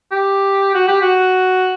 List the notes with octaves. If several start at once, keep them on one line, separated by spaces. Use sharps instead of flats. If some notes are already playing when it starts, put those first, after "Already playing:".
G4
F#4
G4
F#4